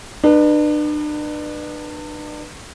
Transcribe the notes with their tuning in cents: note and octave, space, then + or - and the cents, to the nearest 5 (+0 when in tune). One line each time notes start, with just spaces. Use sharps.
D4 +40 B4 -15